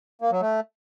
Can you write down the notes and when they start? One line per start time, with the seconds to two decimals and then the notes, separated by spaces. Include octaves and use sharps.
0.22 A#3
0.31 F#3
0.41 A3